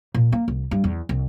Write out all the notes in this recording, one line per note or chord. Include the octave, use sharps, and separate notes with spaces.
A#2
A#3
C2
G2
E2
C2